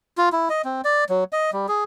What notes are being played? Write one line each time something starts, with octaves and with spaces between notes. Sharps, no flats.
F4
E4
D#5
C4
D5
F#3
D#5
G3
G#4